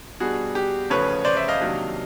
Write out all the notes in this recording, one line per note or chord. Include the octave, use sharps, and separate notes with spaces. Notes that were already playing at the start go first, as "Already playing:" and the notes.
B2 G3 B3 D4 F#4 G#4
G4
E2 C#3 F3 A3 C#4 B4 C#5
C5 D5
D5 E5
D#5 F5
C3 D#3 F#3 A#3 D4